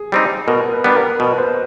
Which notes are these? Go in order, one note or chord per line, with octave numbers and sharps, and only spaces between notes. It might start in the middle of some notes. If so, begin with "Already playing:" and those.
Already playing: G#4
G3 C4 D#4
B2 A#4
B4
G3 B3 D4
A#4
B2 B4
C5